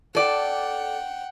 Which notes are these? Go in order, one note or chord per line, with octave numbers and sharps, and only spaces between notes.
A4 D5 F#5 G5